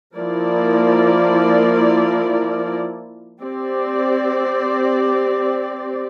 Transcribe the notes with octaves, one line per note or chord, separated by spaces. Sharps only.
F3 A#3 E4 A#4 D5
C4 G4 D5